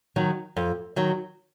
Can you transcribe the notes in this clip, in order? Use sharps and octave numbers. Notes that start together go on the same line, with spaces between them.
D#3 F#3
F2
D#3 F#3